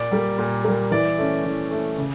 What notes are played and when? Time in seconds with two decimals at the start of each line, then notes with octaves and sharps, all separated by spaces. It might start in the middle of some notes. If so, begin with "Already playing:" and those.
Already playing: A#2 D5
0.12 G3 A#3
0.39 A#2
0.64 G3 A#3
0.91 E3 D5
1.18 A3 C#4
1.45 E3
1.71 A3 C#4
1.98 C#3